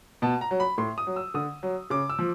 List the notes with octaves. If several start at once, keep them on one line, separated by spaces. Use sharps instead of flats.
B2 A5
A#5
F#3
B5
A2 C6
D#6
F#3
E6
D3 D#6
F#3
C#3 D6
E6
F3